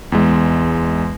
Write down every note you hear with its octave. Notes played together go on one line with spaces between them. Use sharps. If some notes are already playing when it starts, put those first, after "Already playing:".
E2 G#3